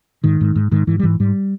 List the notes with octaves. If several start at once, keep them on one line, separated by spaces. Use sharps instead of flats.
G#2 D#3
G#2
G#2
G#2 D#3
G#2 E3
G3
G#2 E3
G#2 G3